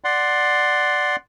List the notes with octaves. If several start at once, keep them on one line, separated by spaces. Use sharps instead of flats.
D5 F#5 C6